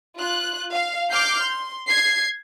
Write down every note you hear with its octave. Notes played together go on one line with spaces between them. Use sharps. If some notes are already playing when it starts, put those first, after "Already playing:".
F4 F#6
F5
D6 F6 G6 C7
C6
G#6 C7